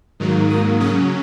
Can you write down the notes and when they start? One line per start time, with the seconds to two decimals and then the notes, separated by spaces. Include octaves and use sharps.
0.20 G#2 D#3 F#3 A#3
0.50 D#6
0.80 C#3 F#3 C#4 D#6